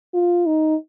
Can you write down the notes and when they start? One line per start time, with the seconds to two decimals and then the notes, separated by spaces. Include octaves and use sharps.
0.14 F4
0.46 D#4